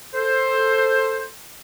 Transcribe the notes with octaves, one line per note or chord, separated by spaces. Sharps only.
A4 C5